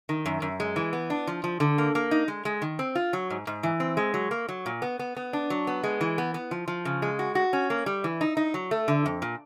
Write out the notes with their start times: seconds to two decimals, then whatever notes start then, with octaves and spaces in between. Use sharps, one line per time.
0.09 D#3
0.26 F#2
0.42 F#2
0.60 G#3
0.76 E3
0.93 B3
1.10 D4
1.27 F3
1.44 F3
1.60 D3
1.78 A#3
1.95 A#3
2.11 D#4
2.28 G#3
2.45 G#3
2.62 D#3
2.79 C4
2.95 F4
3.13 F#3
3.30 G#2
3.47 G#2
3.63 E3
3.80 C4
3.97 G#3
4.14 F#3
4.31 A#3
4.49 F#3
4.66 A#2
4.82 B3
4.99 B3
5.17 B3
5.33 D4
5.50 F#3
5.67 B3
5.84 G#3
6.01 E3
6.18 B3
6.34 B3
6.51 F3
6.68 F3
6.85 C#3
7.02 G#3
7.19 F#4
7.35 F#4
7.53 C#4
7.70 A#3
7.86 G3
8.04 E3
8.21 D#4
8.37 D#4
8.54 F#3
8.71 A3
8.88 D3
9.06 F2
9.22 A#2